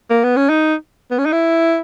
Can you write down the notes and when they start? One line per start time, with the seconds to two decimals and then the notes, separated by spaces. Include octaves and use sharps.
0.10 A#3
0.24 B3
0.37 C#4
0.50 D#4
1.11 B3
1.18 C#4
1.26 D#4
1.32 E4